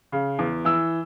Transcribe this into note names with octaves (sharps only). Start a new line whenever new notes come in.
C#3
E2
E3 E6